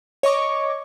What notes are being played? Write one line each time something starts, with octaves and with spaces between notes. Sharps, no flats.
C#5 D#5 C#6 D6